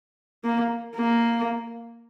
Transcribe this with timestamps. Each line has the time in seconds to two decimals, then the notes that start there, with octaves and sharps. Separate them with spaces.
0.44 A#3
0.96 A#3